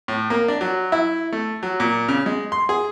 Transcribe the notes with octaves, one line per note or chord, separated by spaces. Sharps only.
A2
A#3
D4
F#3
E4
A3
F#3
A#2
C#3
G#3
C6
G#4